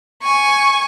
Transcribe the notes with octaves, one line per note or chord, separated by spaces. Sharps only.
G#5 C#6